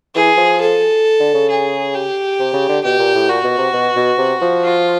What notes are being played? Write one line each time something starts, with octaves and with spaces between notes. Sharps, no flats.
E3 G#4
F3
A4
D3
C#3
G#4
G4
C3
C#3
D3
B2 G4
A#2
A2
A#2 F#4
B2
C3
B2
B2
C3
F3
F4